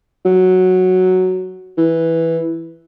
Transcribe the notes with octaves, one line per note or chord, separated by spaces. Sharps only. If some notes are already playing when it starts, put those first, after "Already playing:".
F#3
E3